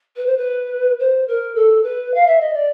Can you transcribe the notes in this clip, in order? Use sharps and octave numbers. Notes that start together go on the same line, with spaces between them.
B4
C5
B4
C5
A#4
A4
B4
F5
E5
D#5
D5